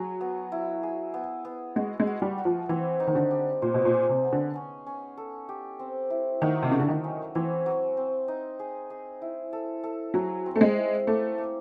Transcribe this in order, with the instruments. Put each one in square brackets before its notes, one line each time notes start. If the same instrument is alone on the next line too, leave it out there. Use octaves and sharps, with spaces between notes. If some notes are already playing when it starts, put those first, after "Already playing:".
Already playing: [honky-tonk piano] F#3 [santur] G#4
[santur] B3
E4
G#4
B3
B3
[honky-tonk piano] G#3 [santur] F#4
[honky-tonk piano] G#3
[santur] F#4
[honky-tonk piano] G3
[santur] F#4
[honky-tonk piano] F3
[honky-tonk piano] E3 [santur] C4
[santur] D#4
[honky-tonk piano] D#3
D3
[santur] G3
[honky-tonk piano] A#2 [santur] C5
[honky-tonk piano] B2
A#2
[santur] G#4
[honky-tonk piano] C3
[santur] B3
[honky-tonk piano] D3
[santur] C#4
C#4
A4
G4
C4
E4
[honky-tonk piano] D#3 [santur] F#3
[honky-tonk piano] C3
[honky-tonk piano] C#3 [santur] F#3
[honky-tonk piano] D3
D#3
[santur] C#4
[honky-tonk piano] E3 [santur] C4
[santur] F#3
C4
D#4
G#4
G#4
E4
A4
A4
[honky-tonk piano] F#3 [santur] G#4
[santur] C4
[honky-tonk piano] A3
G#3
[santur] E4
[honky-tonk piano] A3 [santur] A#3
[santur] A#3